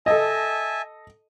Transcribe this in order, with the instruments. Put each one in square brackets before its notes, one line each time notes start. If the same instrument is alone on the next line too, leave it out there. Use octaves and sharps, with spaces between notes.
[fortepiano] A4 D#5 [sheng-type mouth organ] E5 G#5 A5